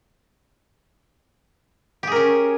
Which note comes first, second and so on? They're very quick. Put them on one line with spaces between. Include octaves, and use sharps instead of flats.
G4 G#4 A#4 C#4